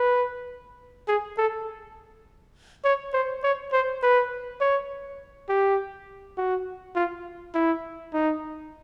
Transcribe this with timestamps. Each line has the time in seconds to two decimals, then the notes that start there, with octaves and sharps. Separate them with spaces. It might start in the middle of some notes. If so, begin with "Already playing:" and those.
Already playing: B4
1.08 G#4
1.38 A4
2.85 C#5
3.13 C5
3.43 C#5
3.72 C5
4.02 B4
4.61 C#5
5.49 G4
6.37 F#4
6.95 F4
7.54 E4
8.13 D#4